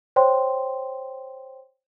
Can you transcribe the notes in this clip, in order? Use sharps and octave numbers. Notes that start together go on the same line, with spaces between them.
C5 C#5 G5 C6